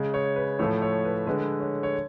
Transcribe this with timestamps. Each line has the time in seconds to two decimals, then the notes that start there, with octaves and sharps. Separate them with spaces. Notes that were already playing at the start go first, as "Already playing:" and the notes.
Already playing: C#3 G#3
0.14 C#5
0.36 B4
0.59 A2 F3 A3 C#5
0.82 C#5
1.05 B4
1.27 D3 G#3 B4
1.60 C#5
1.83 C#5